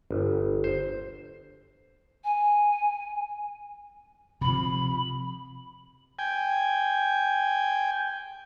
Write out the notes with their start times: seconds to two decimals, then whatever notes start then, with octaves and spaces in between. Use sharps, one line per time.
0.11 G1
0.64 C5
2.24 G#5
4.41 C3 F3 B5
6.19 G5 G#5